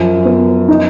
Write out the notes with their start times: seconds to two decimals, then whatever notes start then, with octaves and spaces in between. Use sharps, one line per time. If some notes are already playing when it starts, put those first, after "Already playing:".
Already playing: F#2 F3
0.25 B3
0.68 D#4